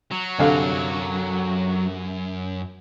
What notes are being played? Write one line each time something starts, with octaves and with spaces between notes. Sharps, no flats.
F#3
C2 F#2 D3 F5